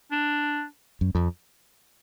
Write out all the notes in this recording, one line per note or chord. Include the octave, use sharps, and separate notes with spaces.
D4
F#2
F2